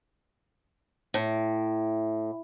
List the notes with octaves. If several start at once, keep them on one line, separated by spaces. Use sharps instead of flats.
A2